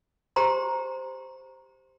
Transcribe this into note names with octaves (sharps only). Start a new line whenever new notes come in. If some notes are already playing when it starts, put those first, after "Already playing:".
G4 C5 A#5 C6